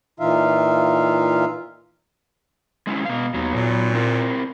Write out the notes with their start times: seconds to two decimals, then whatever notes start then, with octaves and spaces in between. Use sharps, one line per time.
0.20 A#2 E3 D#4 F4 E5 F5
2.87 G#3 C#4 E4
3.05 B2 B3 F5
3.34 D#2 F#3 B3 D#4
3.55 A#2
3.94 C4 E4 A#4